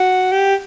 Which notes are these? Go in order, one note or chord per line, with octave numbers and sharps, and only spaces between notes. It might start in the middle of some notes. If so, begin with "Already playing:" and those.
Already playing: F#4
G4